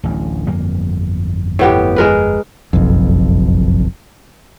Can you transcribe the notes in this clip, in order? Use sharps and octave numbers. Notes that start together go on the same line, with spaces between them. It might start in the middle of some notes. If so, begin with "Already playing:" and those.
D1 A1 D2
G1 F2 A#3
A2 B3 G4
G#3 A#4 B4
F#1 B1 F2